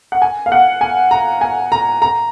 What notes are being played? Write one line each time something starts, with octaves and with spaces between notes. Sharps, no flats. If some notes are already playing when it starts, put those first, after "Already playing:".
F#5
G#5
F5
F#5
G#5
A#5
G#5
A#5
A#5